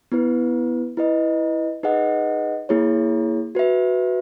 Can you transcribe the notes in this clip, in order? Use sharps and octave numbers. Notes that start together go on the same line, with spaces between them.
B3 E4 B4
E4 B4 D#5
D#4 G#4 B4 D#5 F#5
A#3 E4 G#4 C#5
F#4 B4 E5